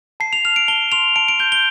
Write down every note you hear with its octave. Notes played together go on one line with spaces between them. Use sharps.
A5 C7
F7
F6 F7
D7
A5 G7
C6 F7
A5 D7
D7
G6 G7
G7